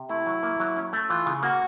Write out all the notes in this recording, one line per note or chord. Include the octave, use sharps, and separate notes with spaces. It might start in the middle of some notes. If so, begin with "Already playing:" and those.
Already playing: C3
A3 E4
F#3
A#3
F#3
C#4
A3
E3 F4
C#3
A#3 F#4